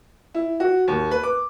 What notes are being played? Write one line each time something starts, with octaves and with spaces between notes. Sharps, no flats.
E4
F#4
D#2
B4
D6